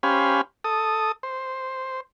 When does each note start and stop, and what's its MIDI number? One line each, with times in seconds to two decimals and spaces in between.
0.03 0.41 61
0.03 0.41 67
0.03 0.41 72
0.03 0.41 77
0.03 0.41 80
0.03 0.41 83
0.64 1.12 69
0.64 1.12 87
1.23 2.00 72